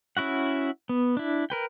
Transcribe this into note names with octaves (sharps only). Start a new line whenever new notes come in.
C#4 E4 F#4 F#5
B3
D4 E4
A#4 B4 G5